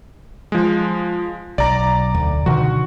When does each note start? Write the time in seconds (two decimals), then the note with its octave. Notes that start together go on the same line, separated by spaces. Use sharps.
0.52 F3 G#3
1.58 B1 D5 A#5
2.14 D2
2.46 B2 D3 D#3 F#4